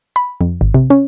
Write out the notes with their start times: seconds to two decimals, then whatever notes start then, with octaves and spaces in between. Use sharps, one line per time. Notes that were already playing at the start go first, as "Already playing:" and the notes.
0.16 B5
0.41 F2
0.61 G#1
0.74 C3
0.90 C#4